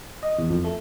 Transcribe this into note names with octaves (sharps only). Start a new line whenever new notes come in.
D#5
E2
F2
A3